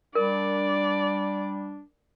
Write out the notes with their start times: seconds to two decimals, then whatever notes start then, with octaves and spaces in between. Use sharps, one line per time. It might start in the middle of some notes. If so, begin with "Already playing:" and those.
0.15 G3 D4 A#4 D5